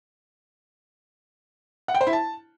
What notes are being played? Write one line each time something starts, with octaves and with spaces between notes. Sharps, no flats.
F#5
G5
C5
E4
A5